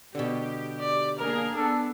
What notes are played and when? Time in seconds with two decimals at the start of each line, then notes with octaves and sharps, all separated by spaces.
0.15 B2 D3 G4
0.80 D5
1.19 A#3 D4 G#4 A#4
1.55 B3 D4 A4